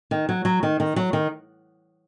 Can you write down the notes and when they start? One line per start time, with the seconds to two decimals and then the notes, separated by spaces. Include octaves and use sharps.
0.11 D#3
0.29 F#3
0.45 F#3
0.63 D#3
0.80 D#3
0.96 F#3
1.13 D#3